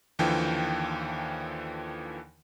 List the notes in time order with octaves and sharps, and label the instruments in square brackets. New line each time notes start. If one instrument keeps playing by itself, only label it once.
[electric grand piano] D#2 D3 E3 F3 G5